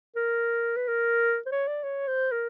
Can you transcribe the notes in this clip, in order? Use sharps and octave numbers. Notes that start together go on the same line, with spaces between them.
A#4
B4
A#4
C5
C#5
D5
C#5
C5
A#4